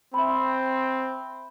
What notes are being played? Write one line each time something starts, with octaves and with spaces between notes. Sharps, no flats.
C4 E5 B5